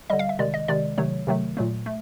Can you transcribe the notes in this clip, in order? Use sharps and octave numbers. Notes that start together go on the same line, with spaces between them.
D3 G3 D#5
F5
E5
C3 D#3 G#3 D5
D#5
C3 D#3 G#3 D5
C3 D#3 F#3 A3 C#5
C3 D#3 F#3 A3
A#2 F#3 A3
A3